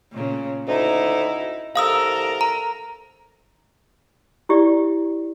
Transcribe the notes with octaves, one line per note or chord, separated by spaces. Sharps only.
A#2 C#3
D2 D#4 E4
C2 A4 A#4 F5 D#6 E6
A#5
E4 G4 D5